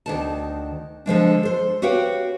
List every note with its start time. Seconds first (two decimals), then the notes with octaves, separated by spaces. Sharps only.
0.06 D2 D#3 A5
1.06 D3 F3 G#3 D4
1.43 A4 C5
1.82 F#4 G4 B4 C#5 F5 G5